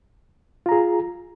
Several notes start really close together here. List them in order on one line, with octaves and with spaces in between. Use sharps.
F4 A#5 G#4